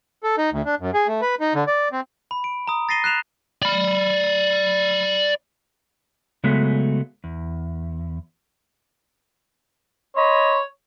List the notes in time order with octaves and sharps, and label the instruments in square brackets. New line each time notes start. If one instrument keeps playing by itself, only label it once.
[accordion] A4
D#4
D2
D4
F#2
G#4
A3
B4
D#4
D3
D5
C4
[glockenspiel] B5
D7
A#5 D#6
A6 A#6 C7 D#7 G7
F#6 C7 E7 F7
[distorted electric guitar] D5 B5
[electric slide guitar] C#3 F#3 G#3 A3 B3
E2
[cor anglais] C#5 [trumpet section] D#5 B5 C6